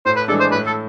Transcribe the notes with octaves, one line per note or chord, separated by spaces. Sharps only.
A2 C5
B4
E3 G#3 D4 A4
C5
A2 B4
A4